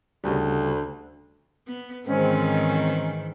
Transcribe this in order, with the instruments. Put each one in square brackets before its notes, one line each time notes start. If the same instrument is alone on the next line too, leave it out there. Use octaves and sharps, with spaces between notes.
[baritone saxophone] D2 [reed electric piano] C#3 G3
[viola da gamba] B3
[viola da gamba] G#2 D#3 E3 [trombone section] G#3 C4 [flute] C#4